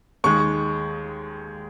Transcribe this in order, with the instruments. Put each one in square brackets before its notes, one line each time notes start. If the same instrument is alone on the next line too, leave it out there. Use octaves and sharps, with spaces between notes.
[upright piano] D#2 D#3 G#3 C#6